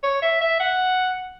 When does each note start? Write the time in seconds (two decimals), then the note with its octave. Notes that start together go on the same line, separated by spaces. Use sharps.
0.03 C#5
0.22 E5
0.41 E5
0.60 F#5